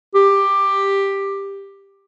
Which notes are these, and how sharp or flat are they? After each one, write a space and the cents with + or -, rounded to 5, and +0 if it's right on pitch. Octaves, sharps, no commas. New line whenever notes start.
G4 +10